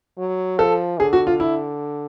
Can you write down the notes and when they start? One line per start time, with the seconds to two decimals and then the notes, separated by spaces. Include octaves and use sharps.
0.18 F#3
0.58 F3 A4
0.99 D3 G#4
1.13 F#4
1.27 F4
1.40 E4